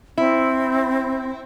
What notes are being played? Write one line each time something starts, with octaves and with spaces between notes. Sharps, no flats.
C4 E4